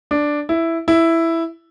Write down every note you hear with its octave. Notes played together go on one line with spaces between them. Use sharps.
D4
E4
E4